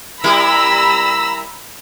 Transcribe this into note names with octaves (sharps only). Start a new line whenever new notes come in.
G3 E4 A#4 A#5 B5 E6